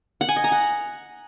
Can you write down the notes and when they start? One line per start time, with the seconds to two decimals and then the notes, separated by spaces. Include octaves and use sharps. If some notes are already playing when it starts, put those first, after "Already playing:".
0.21 F#5
0.29 G#5
0.36 D#5
0.44 A#5
0.52 F#5